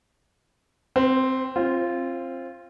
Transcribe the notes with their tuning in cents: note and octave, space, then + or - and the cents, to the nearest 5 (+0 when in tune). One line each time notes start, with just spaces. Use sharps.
C4 +0 C5 -45
C4 +25 F4 -15